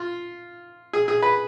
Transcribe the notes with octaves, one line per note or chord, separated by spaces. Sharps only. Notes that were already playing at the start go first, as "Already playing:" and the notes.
Already playing: F4
G#4
G#4
B4